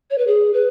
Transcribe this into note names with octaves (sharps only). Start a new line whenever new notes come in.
C#5
B4
G#4
B4